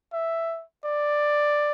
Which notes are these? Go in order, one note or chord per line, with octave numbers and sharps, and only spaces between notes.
E5
D5